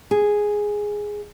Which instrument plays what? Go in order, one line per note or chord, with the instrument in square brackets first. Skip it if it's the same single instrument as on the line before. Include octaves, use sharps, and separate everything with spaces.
[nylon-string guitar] G#4